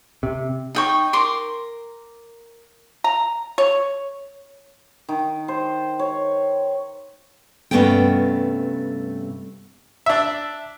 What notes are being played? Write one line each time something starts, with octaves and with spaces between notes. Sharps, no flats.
C3
D#4 G5 C#6
A#4 C6 D6
A#5
C#5
D#3
C5
C#5
G2 C3 A3 B3 C#4 G5
D4 E5